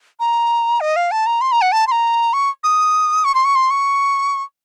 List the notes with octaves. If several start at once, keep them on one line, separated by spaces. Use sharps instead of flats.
A#5
D#5
F5
A5
A#5
C6
A#5
F#5
A5
C6
A#5
C#6
D#6
C#6
C6
C#6
C6
C#6